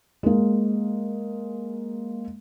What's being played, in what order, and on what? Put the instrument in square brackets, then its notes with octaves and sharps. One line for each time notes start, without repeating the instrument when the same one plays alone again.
[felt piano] G#3 A#3